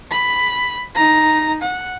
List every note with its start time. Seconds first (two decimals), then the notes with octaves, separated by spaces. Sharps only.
0.11 B5
0.95 D#4 A#5
1.62 F#5